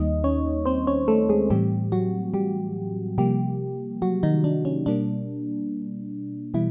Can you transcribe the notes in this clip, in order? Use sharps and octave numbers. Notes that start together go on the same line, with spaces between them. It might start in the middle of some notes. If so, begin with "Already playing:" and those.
Already playing: D#2 D#3 G3 A#3 D#4 D#5
C#4 C#5
C4 C5
C#4 C#5
A3 A4
G#3 G#4
A2 E3 G3 A3 C4 G4
F#3 F#4
G3 G4
C3 F3 G3 A#3 G4
F#3 F#4
D#3 D#4
D4
C#4
B2 G3 A#3 D4
B2 E3 G3 E4